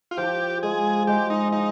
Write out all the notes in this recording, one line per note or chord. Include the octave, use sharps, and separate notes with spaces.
F4
F3 G4
G#3 G#4
G#3 G4
D#4
F3 D#4